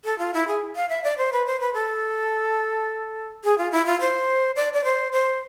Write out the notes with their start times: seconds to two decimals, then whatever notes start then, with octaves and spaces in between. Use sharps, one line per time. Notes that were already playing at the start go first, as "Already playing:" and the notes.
0.04 A4
0.19 F4
0.34 E4
0.47 G#4
0.76 F5
0.89 E5
1.04 D5
1.18 C5
1.33 B4
1.47 C5
1.61 B4
1.74 A4
3.44 G#4
3.58 F4
3.72 E4
3.86 F4
4.00 C5
4.56 D5
4.73 D5
4.84 C5
5.12 C5